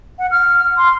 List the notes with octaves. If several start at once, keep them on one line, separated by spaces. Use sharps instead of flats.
F#5
F6
C6